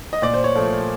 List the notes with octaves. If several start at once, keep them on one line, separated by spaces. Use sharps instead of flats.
D#5
A#2 D5
C5
C#5
F3 A3